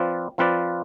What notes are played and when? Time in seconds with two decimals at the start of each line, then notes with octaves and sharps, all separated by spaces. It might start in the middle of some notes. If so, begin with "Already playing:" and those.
Already playing: F3 C4 F4 B4 D5
0.38 F3 C4 F4 B4 D5